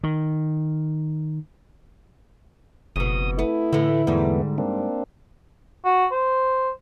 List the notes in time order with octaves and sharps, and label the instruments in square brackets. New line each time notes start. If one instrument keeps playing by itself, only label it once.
[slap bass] D#3
[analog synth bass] F#1 [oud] F2 B2 [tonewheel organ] D#6
[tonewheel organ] A3 [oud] B3 [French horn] E4
[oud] A2 E3 [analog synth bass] D3
[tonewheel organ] E2 A3 B3 [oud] G#2 G3
[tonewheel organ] A#3 C4 D4
[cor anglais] F#4
C5